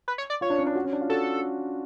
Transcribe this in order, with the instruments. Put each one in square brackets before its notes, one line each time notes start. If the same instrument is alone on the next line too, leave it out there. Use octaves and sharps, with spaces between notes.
[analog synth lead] B4
C#5
D5
[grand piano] F4 [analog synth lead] C#5
[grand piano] D4
C#4
D4
F#4
C#4
D4
F4
[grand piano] F#4 [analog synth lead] A4